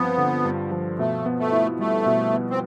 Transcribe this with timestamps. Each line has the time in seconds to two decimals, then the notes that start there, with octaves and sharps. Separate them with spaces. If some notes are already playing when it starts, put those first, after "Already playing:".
Already playing: G2 F3 B3 C4
0.18 D3
0.45 G2
0.72 F3
0.99 B2 A3
1.26 B3
1.39 A3
1.52 E4
1.79 G3 A3
2.06 B2
2.33 B3
2.50 C4